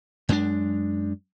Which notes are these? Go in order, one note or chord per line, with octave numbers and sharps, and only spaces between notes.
F#2 G#3 A3 D4